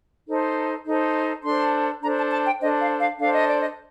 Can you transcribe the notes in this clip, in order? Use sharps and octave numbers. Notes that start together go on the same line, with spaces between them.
D#4 A4 C5
D#4 A4 C5
D4 A4 C5 C6
D4 A4 C5 A#5
A5
A5
G5
D4 A4 C5 D#5
F5
F5
D4 A4 C5 F5
D#5
D5
D#5